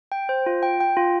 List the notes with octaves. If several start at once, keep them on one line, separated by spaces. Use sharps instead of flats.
G5
C5
F4
G5
G5
F4